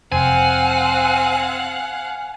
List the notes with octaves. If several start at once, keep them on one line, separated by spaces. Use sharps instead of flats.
F1 C4 F5 F#5 G#5 F#6